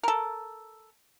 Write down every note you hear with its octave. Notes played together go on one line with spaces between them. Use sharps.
A4 A#4